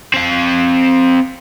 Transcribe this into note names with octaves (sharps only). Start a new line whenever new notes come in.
C4 F5